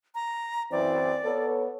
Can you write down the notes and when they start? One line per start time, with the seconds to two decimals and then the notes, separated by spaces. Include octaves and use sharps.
0.15 A#5
0.72 F#2 E3 C4 D5
1.24 B3 A4 C#5